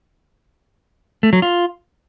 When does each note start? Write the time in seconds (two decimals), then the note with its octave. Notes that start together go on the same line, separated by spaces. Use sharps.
1.23 A3
1.33 F#3
1.42 F4